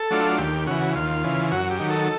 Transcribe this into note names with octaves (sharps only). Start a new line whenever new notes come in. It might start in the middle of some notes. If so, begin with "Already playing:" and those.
Already playing: A4
F#3 A3 D4 F4
D#2 G4
C#3 E3 F#4
D#2 F4
C#3 E3
F#2 F#4
G4
D#3 F#3
A4